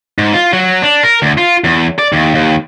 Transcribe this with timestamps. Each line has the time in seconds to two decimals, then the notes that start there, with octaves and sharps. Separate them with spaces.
0.18 G#2
0.34 F4
0.53 F#3
0.82 D4
1.03 A#4
1.22 D2
1.38 F4
1.64 E2
1.99 D5
2.13 D#2
2.35 D#2